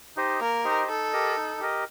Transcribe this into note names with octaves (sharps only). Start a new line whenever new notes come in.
D#4 G4 C5 D#5
A#3 A#4
D#4 G4 C5 D#5
D#4 A4
G4 A#4 D#5
D#4
G4 A#4 D#5